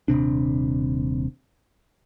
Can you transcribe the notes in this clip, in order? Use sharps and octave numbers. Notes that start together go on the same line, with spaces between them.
D#1 B1 C3 D4